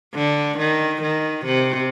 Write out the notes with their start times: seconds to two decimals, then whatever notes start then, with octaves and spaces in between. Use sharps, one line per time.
0.14 D3
0.58 D#3
1.02 D#3
1.46 C3